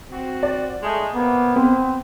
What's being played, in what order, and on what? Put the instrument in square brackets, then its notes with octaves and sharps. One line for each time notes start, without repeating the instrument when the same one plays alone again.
[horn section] C4 F#4
[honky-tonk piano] D5
[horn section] G#3 A3 D#4
[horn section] C3 A#3 [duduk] B3
[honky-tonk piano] B3 [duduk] C4